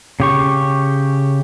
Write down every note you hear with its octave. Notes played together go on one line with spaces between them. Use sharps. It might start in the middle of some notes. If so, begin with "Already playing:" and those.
C#3 G4 C#6